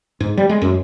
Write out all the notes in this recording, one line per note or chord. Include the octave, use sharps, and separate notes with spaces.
G#2
G3
G#3
F#2